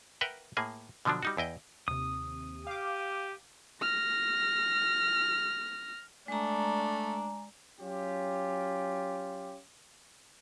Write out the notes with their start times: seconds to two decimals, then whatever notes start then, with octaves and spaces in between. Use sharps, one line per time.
0.21 A#4 B4 E5 F#5 G5
0.57 A2 A#3 G#4 G#5
1.05 B2 D3 F3 F#3 D4
1.23 G3 D#4 F#4
1.37 E2 E4 D#5 G5
1.88 D#2 C3 D#6
2.67 G4 F5 D6
3.82 F6 A#6
6.28 G#3 A3 D4 A#5
7.80 F#3 C#4 F4 G4